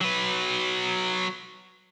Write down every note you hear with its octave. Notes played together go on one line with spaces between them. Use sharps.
F#3 B4